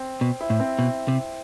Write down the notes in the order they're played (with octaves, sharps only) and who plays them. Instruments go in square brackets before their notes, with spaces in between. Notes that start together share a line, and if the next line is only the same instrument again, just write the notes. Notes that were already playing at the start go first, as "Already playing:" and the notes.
Already playing: [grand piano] C4
[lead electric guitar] B2
[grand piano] E4
[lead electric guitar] A2
[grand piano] C4
[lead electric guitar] B2
C3